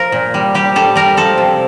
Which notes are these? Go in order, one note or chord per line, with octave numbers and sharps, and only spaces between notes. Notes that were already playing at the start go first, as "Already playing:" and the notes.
Already playing: F3 A#4
A#2
G3
G3 G4
G3 A4
G3 A#4
F3 A4
C3